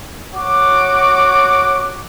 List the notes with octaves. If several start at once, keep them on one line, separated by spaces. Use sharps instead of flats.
F#4 C#5 D6